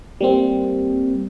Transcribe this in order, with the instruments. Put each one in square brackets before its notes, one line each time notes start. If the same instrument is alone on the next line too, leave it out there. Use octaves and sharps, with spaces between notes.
[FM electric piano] G3 A#3 C4